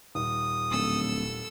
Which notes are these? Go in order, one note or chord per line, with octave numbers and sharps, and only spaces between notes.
D#1 D#6
D1 A4 E6